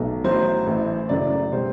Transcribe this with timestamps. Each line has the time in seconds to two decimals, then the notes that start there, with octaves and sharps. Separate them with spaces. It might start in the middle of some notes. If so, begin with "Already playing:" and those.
Already playing: B1 B2 F#3 A3
0.24 A1 A2 F#3 C5
0.66 A1 A2 E3
1.09 F#1 F#2 F#3 A3 D5
1.52 B2 G3 C5